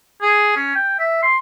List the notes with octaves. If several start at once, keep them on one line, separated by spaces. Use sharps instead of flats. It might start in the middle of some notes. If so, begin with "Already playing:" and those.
G#4
C#4
G5
E5
C6